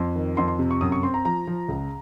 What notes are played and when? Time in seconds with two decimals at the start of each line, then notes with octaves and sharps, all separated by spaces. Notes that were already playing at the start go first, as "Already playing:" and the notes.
Already playing: F2 C6
0.15 D#3
0.37 F2 C6
0.48 C6
0.59 C3
0.71 C#6
0.81 F#2 D#6
0.92 C#6
1.03 C4 C6
1.14 A#5
1.25 F3 A#5
1.47 F3
1.68 C#2